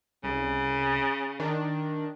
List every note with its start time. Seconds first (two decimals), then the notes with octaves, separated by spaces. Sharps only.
0.24 C2 C#3
1.40 D#3 D4